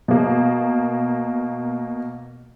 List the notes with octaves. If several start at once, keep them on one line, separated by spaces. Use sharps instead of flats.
B2 A#3